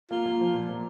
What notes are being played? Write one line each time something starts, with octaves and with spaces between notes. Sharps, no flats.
A#3 F4
A#3
F3
A#2
A#3